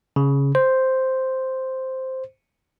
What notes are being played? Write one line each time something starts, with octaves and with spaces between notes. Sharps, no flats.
C#3
C5